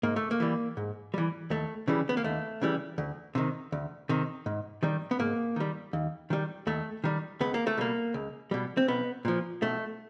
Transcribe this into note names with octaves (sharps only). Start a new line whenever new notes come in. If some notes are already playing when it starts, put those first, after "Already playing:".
G#2 A#3
A3
A#3
E3 G3
G#2
E3 G3
D#2 A3
C#3 E3 G3
B3
A#3
D#2 A3
C#3 E3 G3
D2
C3 D#3
D2
C3 D#3
G#2
D#3 G3
B3
G#2 A#3
D#3 G3
D#2
D#3 G3
D#2 A3
D#3 G3
C#2 B3
A#3
A3
B2 G3 A#3
C#2
B2 G3
C4
B1 B3
A#2 F3
B1 A3